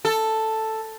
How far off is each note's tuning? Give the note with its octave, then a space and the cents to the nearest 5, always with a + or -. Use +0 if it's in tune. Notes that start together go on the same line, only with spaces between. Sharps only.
A4 +5